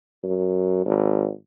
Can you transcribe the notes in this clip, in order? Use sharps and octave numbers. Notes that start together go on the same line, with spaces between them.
F#2
G#1